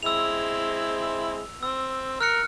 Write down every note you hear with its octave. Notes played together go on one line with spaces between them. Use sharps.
G#3 C4 E4 E6 F7
C4 E6
A#4 F6 F#6 C#7